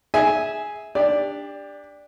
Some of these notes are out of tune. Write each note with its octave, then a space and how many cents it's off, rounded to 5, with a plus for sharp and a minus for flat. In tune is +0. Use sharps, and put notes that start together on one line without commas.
G#4 +0 E5 -15 G#5 +0
D4 +0 G4 +25 D5 +0